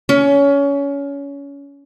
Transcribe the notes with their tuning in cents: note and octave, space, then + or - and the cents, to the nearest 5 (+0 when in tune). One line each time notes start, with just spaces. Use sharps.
C#4 +25